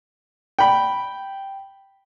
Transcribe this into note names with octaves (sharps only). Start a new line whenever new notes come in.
G5 B5